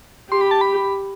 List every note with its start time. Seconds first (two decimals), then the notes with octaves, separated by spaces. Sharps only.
0.31 G4 C6
0.41 B5
0.51 A5
0.61 B5